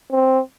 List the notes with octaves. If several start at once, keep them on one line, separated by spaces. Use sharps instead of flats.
C4